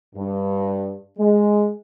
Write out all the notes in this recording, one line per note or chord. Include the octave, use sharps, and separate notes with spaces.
G2
G#3